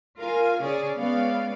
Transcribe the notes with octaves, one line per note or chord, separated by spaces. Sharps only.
F4 A#4 F5 G#5
C#3 C#4 G#4 D5
G#3 B3 C#4 D5 F5